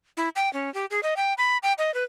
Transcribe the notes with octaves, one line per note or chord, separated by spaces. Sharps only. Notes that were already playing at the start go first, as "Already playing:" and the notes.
E4
G5
C#4
G4
G#4
D#5
G5
B5
G5
D#5
B4